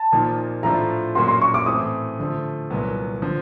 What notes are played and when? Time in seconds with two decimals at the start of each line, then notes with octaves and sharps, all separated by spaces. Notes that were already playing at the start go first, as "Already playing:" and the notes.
Already playing: A5
0.12 A#2 F3 A#3 D#4
0.63 A2 F3 A3 D4 F4 A#5
1.15 A#2 F#3 A#3 C#4 F#4 C6
1.28 C6
1.42 C#6
1.54 D6
1.66 A2 E3 A3 C4 D#6
2.19 D3 F3 A3
2.70 C2 A#2 F#3 B3
3.22 D3 F3